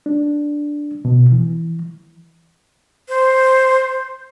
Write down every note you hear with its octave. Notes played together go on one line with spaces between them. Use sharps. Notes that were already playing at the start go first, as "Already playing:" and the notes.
D4
B2
E3
C5